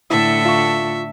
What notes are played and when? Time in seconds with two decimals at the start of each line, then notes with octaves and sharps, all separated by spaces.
0.11 A2 D3 E4 A4 E5
0.45 F4 C#6